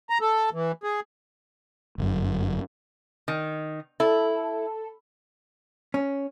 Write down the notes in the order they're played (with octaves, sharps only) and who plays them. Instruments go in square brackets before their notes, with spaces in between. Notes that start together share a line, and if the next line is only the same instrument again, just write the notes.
[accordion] A#5
A4
E3
G#4
[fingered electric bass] G1 F#2
[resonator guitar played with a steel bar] D#3
[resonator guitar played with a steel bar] E4 [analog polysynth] A4
[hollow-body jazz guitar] C#4